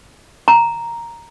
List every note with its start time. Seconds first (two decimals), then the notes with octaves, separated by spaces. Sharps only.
0.48 A#5